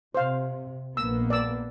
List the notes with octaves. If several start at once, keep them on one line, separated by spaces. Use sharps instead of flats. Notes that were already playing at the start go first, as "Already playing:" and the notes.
C3 C5 F5
A#1 A#3 B3 E6
D5 E6